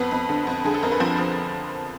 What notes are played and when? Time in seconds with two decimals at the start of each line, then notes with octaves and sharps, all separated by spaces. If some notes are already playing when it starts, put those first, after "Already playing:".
Already playing: F2 B3 B4
0.11 F2
0.29 D3
0.47 F2
0.64 D3 G#4
0.74 A4
0.82 F2 A#4
0.92 B4
1.00 F3 C4 C5
1.18 F3